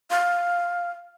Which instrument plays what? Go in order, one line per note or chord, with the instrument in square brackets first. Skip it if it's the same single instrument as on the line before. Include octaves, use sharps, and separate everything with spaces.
[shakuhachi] F5